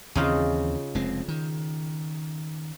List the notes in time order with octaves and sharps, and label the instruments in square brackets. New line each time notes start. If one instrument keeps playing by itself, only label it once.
[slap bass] D#2 E3 C4 [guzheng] C#3 D#4 F4
[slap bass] F1 G#3 C4
D#3